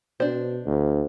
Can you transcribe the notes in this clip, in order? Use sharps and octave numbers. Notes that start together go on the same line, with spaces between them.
B2 D4 C5
D2